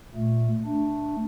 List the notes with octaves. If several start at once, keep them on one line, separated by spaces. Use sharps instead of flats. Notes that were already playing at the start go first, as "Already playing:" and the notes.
A#2 A3
A3 D4